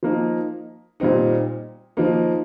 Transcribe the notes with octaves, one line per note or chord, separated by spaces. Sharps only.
F3 A#3 D#4
A#2 G3 C4 D#4
F3 A#3 D#4